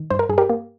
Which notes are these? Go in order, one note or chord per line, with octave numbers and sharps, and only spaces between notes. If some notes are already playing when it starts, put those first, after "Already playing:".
Already playing: D#3
G2 C5
A#4
G2 G#4
G4 A#4
A#3